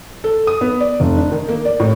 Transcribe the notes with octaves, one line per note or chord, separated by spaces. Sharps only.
A4
D#6
B3
D5
F1
D4
D#3
A#3
D5
A2